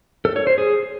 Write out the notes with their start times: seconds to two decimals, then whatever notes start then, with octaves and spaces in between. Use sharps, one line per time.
0.25 A4
0.36 C#5
0.47 C5
0.58 G#4